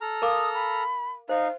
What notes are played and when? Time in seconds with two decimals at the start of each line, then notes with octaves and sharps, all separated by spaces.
0.01 A4 A#5 F6
0.22 A#4 F5 D6 D#6
0.54 B5
1.29 D#4 C5 F5